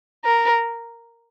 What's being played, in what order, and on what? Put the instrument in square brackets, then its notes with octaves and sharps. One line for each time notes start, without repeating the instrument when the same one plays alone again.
[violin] A#4